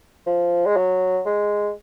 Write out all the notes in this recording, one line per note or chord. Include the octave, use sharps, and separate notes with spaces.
F3
G#3
F#3
G#3